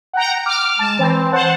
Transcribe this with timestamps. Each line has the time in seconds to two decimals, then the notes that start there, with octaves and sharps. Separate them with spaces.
0.13 F#5 G5 A#5
0.46 D6 F6
0.79 G#3 A5
0.99 E3 C4
1.32 C5 F#5 A5